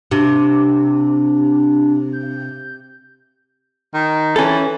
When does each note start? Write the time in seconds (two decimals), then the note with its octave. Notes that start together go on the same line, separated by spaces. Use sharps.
0.11 C3 D4
2.13 G6
3.94 D#3
4.36 E3 C#4 A4